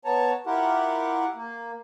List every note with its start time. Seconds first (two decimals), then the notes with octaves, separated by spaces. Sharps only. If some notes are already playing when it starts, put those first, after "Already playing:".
0.05 B3 C#5 A5 A#5
0.46 E4 F4 G4 A#4 F#5
1.35 A#3